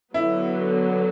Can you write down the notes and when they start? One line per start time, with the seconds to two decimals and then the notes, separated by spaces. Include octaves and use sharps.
0.14 D3 F#3 B3 E4